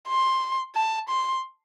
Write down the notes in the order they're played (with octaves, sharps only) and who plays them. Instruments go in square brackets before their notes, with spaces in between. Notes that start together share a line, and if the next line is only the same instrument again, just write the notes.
[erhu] C6
A5
C6